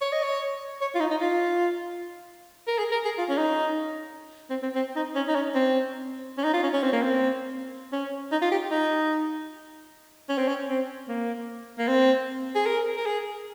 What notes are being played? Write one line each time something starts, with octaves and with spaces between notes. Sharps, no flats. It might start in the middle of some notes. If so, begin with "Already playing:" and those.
C#5
D#5
C#5
C#5
F4
D#4
D#4
F4
A#4
G#4
A#4
G#4
F4
C#4
D#4
C4
C4
C4
D#4
C#4
D#4
C#4
C4
C#4
D#4
F4
C#4
C#4
C4
A#3
C4
C#4
D#4
F4
G4
D#4
C#4
C4
C#4
C4
A#3
A#3
C4
G#4
A#4
A#4
G#4